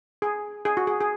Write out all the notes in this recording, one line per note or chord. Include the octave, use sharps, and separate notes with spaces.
G#4
G#4
F#4
G#4
G#4